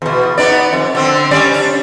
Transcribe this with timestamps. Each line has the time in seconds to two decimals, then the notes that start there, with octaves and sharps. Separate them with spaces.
0.02 E2 B2
0.38 B3 D#4 D5
0.73 F2
0.95 D3 C4
1.31 G3 C#4 D5
1.52 D4